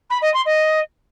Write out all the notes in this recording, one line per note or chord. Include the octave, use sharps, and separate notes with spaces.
B5
D#5
C6
D#5